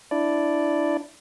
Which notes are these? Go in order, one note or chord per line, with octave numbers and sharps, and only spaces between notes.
D4 E4 D5